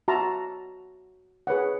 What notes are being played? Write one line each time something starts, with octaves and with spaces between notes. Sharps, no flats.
F#4 E5 A5 A#5 C6
G#4 B4 C#5 F#5